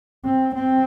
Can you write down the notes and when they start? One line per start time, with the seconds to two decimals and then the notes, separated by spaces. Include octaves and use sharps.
0.25 C4
0.55 C4